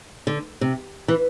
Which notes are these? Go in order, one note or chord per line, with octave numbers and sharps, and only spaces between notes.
D3
C3
E3